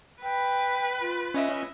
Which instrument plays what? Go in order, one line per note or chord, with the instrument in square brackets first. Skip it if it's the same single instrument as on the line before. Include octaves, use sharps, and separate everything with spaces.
[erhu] B4 [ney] G5
[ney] F4
[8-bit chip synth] C#4 D#5 E5